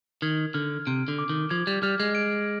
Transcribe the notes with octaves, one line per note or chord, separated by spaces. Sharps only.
D#3 G#6
D3 F6
C3 D7
D3
D6
D#3
F3 G#6
G3
G3 F6
G#3
D7